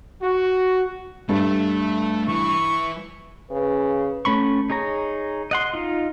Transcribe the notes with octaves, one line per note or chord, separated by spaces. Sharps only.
F#4
G2 A3 A4
E3 C#6
C#3 B4
A3 C#4 B5 C#6
D#4 G#4 C#5 A#5
D#5 F#5 C6
D#4 F4